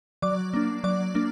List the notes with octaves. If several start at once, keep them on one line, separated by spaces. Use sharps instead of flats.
F#3 D5 D6
A#3 D4
F#3 D5 D6
A#3 D4